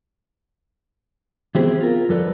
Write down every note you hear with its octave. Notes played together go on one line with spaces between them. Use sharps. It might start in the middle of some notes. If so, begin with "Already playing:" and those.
E3 B3 C4 G4 G#4 C5
F4 A#4
F2 G3 A4 B4 D5